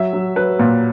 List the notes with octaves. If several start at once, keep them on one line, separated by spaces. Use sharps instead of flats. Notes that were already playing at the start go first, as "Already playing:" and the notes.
Already playing: F#3 E5
F#3
F#3 B4
A#2